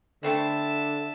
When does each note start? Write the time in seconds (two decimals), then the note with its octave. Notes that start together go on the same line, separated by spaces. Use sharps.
0.23 D3 A3 C4 E4 E5 A5